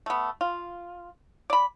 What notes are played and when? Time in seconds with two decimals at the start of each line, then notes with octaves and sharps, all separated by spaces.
0.06 A3 B3
0.41 F4
1.50 D5 B5